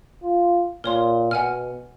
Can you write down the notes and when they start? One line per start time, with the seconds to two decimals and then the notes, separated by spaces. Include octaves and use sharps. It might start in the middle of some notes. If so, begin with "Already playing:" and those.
0.22 F4
0.84 A#2 A#4 C#5 C6
1.31 B2 F#5 G#5 F6